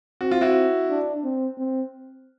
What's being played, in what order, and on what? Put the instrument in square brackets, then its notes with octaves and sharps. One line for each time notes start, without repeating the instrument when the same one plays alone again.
[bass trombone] C4 [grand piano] F#4
[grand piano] F4
E4 F#4
[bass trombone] D4
C4
C4